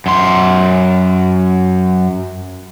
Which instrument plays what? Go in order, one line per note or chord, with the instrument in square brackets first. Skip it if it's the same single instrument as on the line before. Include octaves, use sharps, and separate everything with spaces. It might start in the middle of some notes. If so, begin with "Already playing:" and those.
[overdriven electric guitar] F#2 C6